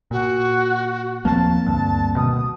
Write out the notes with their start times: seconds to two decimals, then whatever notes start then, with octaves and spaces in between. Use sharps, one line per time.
0.11 A#2 F#4
1.25 D#2 F3 A#3 C4 A5
1.66 D2 G2
2.16 B2 D#3 D#6